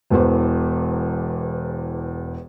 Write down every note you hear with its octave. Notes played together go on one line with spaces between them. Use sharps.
E1 E2 B4 C5